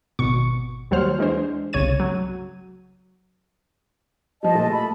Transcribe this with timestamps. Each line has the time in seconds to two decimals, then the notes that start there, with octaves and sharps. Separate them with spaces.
0.19 G#1 B2 C#6
0.91 D#2 F#3 G3 C5 F6
1.19 E3 G#3 D4 C5
1.73 G1 C2 C#3 C#5 G#6 D#7
2.00 F#3
4.43 F3 G3 D#5 A5
4.55 A#2 A3
4.71 A5 B5